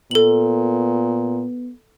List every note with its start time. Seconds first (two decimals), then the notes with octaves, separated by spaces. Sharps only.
0.11 A#2 B3 A4 F#7